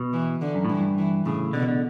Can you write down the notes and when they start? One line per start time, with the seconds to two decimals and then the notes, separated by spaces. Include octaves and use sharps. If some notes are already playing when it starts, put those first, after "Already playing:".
Already playing: B2
0.13 E3
0.41 D3
0.55 F#2
0.65 A2
0.69 G2 E3
0.98 E3
1.26 A2 C#3
1.53 B2 D3
1.68 D3